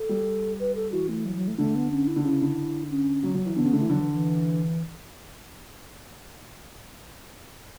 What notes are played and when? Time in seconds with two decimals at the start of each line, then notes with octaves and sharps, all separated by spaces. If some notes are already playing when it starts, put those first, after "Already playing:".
Already playing: A4
0.09 G3
0.60 B4
0.75 A4
0.92 E3 F#4
1.09 A3
1.25 F#3
1.36 F#3
1.48 A3
1.58 D3 A3
1.75 B3
1.91 C#4
2.07 E4
2.16 D3
2.24 C#3 E4
2.41 D3
2.90 C#4
3.23 F#3
3.35 F#3
3.46 E3
3.56 D3 B3
3.65 C#3
3.73 D3 A3
3.81 E3
3.90 D3 F#3
4.00 E3
4.12 E3